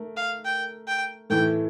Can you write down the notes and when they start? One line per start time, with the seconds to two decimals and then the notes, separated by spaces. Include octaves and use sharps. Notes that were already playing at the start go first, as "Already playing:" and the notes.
Already playing: A3 A#4
0.17 F5
0.45 G5
0.88 G5
1.30 A2 E3 A3 G5